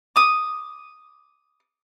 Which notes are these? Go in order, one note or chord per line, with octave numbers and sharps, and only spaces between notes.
D6 D#6